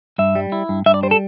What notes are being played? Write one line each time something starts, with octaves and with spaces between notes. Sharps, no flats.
G2 E5
G3
E4
G2
G2 E5
D5
G3 C5
A4